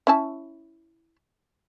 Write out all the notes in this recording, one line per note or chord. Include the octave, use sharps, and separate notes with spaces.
C#4 E4 A5